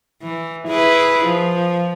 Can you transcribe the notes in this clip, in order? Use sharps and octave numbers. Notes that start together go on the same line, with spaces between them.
E3
E4 G#4 B4
F3